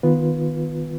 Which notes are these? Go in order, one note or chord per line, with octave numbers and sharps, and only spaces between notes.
D#3 B3 F4 B4